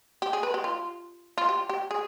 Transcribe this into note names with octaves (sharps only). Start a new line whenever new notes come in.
G4
G#4
B4
G4
F4
F4
G4
G4
G#4